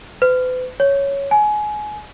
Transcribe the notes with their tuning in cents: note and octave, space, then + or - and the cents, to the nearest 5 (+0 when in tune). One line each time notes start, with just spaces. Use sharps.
B4 +45
C#5 +5
G#5 +25